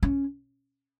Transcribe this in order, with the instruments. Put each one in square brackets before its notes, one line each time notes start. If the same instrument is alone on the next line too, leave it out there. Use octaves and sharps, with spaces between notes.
[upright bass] C#4